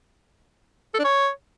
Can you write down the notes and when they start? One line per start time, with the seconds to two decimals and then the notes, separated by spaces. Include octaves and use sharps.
0.94 A4
0.99 D4
1.04 C#5